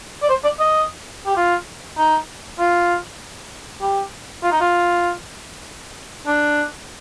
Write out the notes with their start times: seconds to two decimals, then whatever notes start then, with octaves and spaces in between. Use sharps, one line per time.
0.22 D5
0.29 C5
0.44 D5
0.60 D#5
1.27 G4
1.37 F4
1.98 D#4
2.59 F4
3.82 G4
4.43 F4
4.52 D#4
4.61 F4
6.27 D4